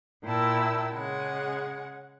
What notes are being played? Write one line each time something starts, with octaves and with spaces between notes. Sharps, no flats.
A#2 E4 A#4 G5 A5 E6
C#3 G#3 F#5